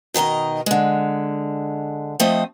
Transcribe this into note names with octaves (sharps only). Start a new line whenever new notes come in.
B2 D#3 A4 A#4 D#5
D3 G#3
F3 A3 C4 D#5